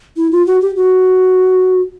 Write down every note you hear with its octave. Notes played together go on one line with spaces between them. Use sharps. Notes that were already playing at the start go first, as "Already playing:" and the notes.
E4
F4
F#4
G4
F#4